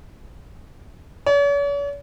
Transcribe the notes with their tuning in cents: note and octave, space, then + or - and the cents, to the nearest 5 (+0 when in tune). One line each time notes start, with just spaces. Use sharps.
C#5 +45